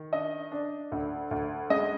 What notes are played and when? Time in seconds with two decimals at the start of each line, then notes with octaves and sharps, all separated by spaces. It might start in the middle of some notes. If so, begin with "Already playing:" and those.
Already playing: D#3
0.13 D4 D#5
0.52 D4
0.92 D2
1.31 D2
1.70 G#3 D#5